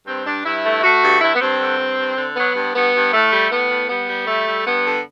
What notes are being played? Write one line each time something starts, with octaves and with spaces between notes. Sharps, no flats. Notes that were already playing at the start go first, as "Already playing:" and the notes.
G2 C4
G2 D4
G2 E4
A3
A3 F#4
G2
G2 E4
B3
G2 C4
D3
G2
G2
D3
F#3 B3
G2
G2 B3
G2
A2 A3
G3
A2 B3
A2
G3 B3
G3
G3 A3
G3
G2 B3
D3